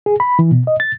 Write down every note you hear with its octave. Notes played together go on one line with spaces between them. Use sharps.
G#4
B5
E3
B2
D#5
A6